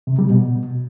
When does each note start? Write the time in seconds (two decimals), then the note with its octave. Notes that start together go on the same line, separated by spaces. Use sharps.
0.07 C3
0.19 G3
0.30 B2